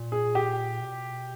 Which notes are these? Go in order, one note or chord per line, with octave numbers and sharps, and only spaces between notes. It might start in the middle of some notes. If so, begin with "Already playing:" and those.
Already playing: A#2
G#4
G4
B2